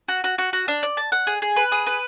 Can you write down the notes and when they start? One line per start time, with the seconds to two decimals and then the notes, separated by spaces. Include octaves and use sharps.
0.08 F#4
0.24 F#4
0.38 F#4
0.53 F#4
0.68 D4
0.83 D5
0.97 A5
1.12 F#5
1.27 G#4
1.42 G#4
1.56 B4
1.72 G#4
1.86 B4